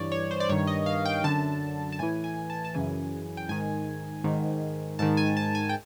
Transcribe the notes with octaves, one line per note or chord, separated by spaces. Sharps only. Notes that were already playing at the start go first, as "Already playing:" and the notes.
Already playing: G2 E3 C#5 D5
C#5
C5
D5
G2 D#3 C#5
D#5
F5
G5
F#2 D3 A5
A5
A2 E3 G#5
G#5
A5
A5
F#2 C#3 E3 G#5
G5
G#2 D#3 G#5
G#2 D#3
G#2 D#3 A5
G#5
A5
G#5
G5